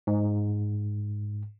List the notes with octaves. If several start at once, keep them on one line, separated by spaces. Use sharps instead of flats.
G#2